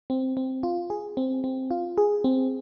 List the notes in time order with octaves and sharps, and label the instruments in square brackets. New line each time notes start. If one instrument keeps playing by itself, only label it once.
[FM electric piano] C4
C4
F4
G#4
C4
C4
F4
G#4
C4